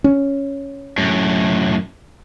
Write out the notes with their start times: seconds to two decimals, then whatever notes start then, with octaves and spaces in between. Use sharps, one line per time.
0.04 C#4
0.98 F#2 A2